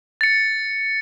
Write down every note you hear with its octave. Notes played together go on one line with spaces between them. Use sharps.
A6 C#7